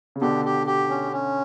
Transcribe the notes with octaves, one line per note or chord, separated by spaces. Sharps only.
C#3
B2 D3 G4
G4
G4
C#4
C#4